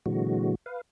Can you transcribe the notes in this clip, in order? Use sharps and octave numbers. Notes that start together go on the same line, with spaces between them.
A#2 D3 E3 F#3 G#3 F#4
B4 F5